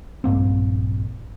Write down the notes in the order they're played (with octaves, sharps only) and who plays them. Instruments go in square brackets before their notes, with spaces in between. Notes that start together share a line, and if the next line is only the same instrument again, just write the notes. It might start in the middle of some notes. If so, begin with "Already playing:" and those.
[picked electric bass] A#1 G2 A#3 C4